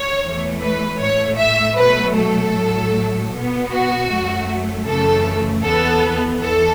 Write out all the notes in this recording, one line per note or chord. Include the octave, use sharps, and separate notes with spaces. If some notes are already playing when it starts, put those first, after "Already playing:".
Already playing: C#5
E2 E3 A3
B4
A2 A3 C#5
E5
B2 F#3 A3 B4
A4
A2 F#3 A3
B2 B3
F#4
F#2 F#3 A3
F#2 C#3 E3 A3 A4
E2 E3 B3 A4
E2 E3 A4